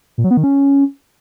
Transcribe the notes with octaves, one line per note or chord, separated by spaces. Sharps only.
A#2
F#3
B3
D#3
C#4